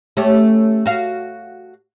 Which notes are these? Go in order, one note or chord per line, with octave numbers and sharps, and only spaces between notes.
A3 C#4 G4
F#4 F5